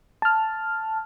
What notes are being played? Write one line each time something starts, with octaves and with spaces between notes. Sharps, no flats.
A5 F6